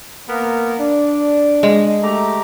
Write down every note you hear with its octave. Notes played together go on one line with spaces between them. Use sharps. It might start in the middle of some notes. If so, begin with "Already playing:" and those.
A#3 B3 A#4
D4
G#3
A3 G4 A#5